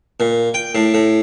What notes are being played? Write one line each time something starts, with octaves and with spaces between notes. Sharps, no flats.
A#2
G5
A2
A2